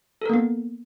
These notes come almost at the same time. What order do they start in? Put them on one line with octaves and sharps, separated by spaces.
A4 A#4 A#3 B3